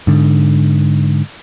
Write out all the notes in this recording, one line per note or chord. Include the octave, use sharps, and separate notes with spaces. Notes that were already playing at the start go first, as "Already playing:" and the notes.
G#2 D3